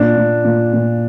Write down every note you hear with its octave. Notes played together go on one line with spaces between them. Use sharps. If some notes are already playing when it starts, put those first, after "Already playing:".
Already playing: A#2 D4
A#2
A#2
A#2